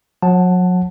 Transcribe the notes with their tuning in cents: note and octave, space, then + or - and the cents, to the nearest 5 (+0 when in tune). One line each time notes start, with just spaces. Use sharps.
F#3 -40 F#5 +0 A5 +0